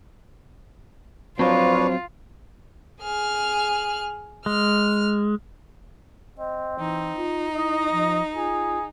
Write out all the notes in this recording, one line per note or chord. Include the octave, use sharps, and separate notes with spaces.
F3 F#3 C4 D4 F4 B4 C#5
G#4 F6
G#3 F6
C4 D#5
E3 D#4
F4
E4 D#5
F3
F4 G#4